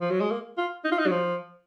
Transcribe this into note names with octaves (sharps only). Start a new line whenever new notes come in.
F3
F#3
G#3
A#3
F4
D#4
F4
D#4
F#3
F3